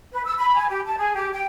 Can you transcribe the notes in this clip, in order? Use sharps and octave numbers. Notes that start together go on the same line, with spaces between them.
B4
E6
B5
G#5
G4
A5
G#4
G4
G5